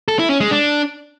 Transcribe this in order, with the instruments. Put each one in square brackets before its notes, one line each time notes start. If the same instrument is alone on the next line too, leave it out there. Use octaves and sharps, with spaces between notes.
[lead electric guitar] A4
E4
C#4
G#3
D4